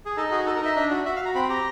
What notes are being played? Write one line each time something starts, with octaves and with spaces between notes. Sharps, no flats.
G#4
D#4 A4
F#4 G#4
D#4 A4
A#4
D#4 E5
D4 E5
F#4
F#4 E5
F5
F#4
A#5
C4 B5
G4 A#5